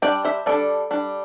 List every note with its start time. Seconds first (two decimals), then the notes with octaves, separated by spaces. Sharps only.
0.02 G3 D4 D5 G5
0.25 C5 E5
0.46 G3 D4 A4 D5
0.91 G3 D4